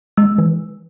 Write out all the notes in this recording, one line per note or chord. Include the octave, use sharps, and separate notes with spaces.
G#3 E6
E3